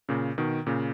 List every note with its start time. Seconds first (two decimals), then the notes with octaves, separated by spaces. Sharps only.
0.09 A#2 C#3
0.38 B2 D#3
0.67 A#2 C#3